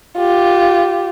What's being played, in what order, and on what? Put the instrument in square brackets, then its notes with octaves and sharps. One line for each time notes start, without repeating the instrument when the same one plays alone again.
[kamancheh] F4 G4